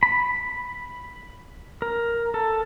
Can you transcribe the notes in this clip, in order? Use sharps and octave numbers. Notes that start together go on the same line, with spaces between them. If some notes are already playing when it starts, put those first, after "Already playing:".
B5
A#4
A4